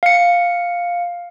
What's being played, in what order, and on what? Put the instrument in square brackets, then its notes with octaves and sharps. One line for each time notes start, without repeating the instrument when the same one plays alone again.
[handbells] F5 C#7